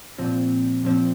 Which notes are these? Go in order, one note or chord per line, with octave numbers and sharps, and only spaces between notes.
A#2 F3 C4
A#2 F3 C4